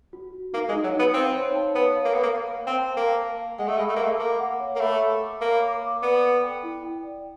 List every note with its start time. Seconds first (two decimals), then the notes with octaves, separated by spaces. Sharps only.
0.13 F#4
0.33 F#4
0.53 A#3 D#4
0.69 G#3
0.73 D#4
0.84 F#3
0.94 D#4
0.99 B3
1.14 C4 F5
1.35 C#5
1.55 A5
1.75 B3 C#5
1.96 F5
2.05 A#3
2.14 B3 C#5
2.23 A#3
2.36 F5
2.57 F5
2.67 C4
2.77 A5
2.97 A#3 A5
3.18 F5
3.38 F5
3.59 G#3 F#5
3.68 A3
3.78 G#3 B5
3.89 A3
3.96 A#3
3.99 A3 F#5
4.19 A#3 D6
4.39 F#5
4.60 C#5
4.76 A#3
4.80 A3 B5
5.01 B5
5.22 D6
5.41 A#3 C#5
5.62 D6
5.82 D6
6.02 B3 D5
6.23 A4
6.43 G5
6.63 E4
6.83 G5
7.04 D5